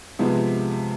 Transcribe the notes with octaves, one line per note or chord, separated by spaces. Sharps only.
C3 F3 G#3 B3 E4